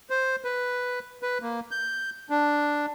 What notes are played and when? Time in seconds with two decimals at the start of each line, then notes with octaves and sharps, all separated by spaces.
0.10 C5
0.44 B4
1.23 B4
1.42 A#3
1.71 G6
2.30 D4